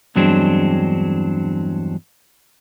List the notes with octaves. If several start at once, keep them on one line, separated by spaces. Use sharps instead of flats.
E2 G2 F#3 G#3 C4 D4